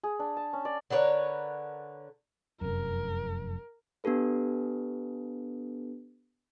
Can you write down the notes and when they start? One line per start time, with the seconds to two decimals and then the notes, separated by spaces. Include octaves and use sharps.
0.03 G#4
0.19 D4
0.37 A5
0.53 C#4
0.65 D5
0.90 D3 A#4 B4 C#5
2.61 F1 F#2 A#4
4.04 B3 D4 G4 A4 B4